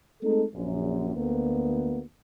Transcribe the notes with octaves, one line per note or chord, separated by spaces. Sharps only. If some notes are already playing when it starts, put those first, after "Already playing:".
G#3 A3 C4 D#4 A4
A#1 F#2
D2 A#3 B3